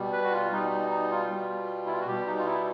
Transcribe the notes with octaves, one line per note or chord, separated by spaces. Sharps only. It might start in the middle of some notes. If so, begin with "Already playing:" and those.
Already playing: B2 G3
B4
F#4
F4
B2 G3 D#4
D#4
D#4
F4
B2 G3
E4
F4
F#4
B2 G3 G4
D#4
F4
E4